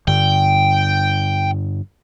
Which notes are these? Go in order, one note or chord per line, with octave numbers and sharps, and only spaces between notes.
G2 D3 G5